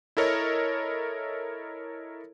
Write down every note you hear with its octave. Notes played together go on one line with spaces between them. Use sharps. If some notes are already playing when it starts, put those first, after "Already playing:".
E4 A4 A#4 C#5 D#5